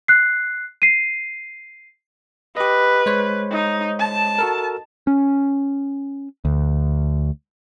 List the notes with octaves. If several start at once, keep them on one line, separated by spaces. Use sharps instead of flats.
F#6 C7
C7 D#7
G4 B4 D#5
G#3 C5 C#5
D#4
A5
F#4 A4 A#4
C#4
D2